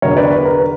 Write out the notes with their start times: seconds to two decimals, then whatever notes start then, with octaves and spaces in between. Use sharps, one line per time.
0.02 E2 D3 F#3 A#4 C#5
0.17 B4 D5
0.31 B4
0.45 A#4
0.59 B4